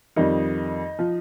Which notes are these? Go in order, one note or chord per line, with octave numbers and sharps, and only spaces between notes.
F2 D#3 G3 D#4
F3